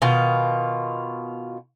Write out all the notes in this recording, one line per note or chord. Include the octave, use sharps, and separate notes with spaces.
B2 D#3 F4